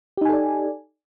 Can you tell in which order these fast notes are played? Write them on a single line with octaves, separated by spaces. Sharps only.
G4 D#4 G#5 A4 D5